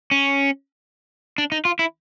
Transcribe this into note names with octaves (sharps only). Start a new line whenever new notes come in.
C#4
D4
D#4
F4
E4